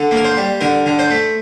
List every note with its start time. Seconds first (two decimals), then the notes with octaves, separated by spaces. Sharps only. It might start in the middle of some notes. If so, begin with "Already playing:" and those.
Already playing: D3 A4
0.11 A#3 A#4
0.25 C5
0.37 G3
0.61 D3 A#4
0.86 D3
0.99 C5
1.11 A3